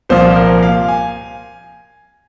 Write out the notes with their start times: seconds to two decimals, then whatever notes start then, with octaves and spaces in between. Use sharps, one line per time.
0.09 C2 A#2 F3 C5
0.36 A#4
0.63 F5
0.88 G#5